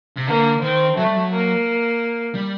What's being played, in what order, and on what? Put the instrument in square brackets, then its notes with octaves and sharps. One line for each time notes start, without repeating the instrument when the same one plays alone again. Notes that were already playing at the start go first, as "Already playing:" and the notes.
[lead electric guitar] C3
[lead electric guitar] D3 [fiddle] A#3
[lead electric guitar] D#3 [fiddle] C4
[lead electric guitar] F#3 [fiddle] A3
[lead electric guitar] G3
F#3
[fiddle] A#3
[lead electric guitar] G3